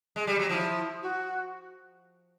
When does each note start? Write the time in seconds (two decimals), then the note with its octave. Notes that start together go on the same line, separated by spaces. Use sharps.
0.16 G#3
0.27 G3
0.39 F#3
0.49 F3 E4
1.02 F#4